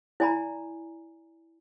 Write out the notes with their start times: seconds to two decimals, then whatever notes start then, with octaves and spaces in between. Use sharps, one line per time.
0.20 E4 D5 G#5 A#5 B5